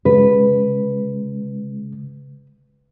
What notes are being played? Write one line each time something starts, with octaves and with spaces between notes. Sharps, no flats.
C#3 G#3 B4